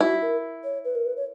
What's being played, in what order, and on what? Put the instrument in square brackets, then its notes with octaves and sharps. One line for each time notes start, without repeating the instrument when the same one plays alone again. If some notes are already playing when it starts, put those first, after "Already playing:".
[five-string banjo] E4 [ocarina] F#4
[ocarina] A#4
C#5
B4
A#4
B4
C#5